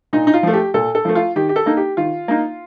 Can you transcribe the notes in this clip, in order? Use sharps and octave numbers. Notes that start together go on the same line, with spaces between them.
A#2 D#4
D#4
F4
F3 A3
G4
A#2 A4
A4
F3 A3
F4
D#3 G4
G4
A4
A#3 D#4
G4
D#3 F4
A#3 D#4